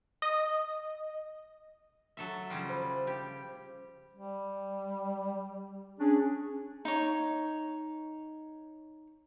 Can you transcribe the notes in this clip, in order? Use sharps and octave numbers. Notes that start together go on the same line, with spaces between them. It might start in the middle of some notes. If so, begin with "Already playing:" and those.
D#5
F#3 A4 E5
C#3 F3 G3
C5 B5
G4
G3
C#4 D4 G#4
D#4 C#5